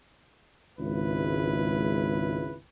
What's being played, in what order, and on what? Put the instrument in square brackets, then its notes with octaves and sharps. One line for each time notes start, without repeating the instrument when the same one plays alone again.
[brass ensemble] G#1 C#2 E4 B4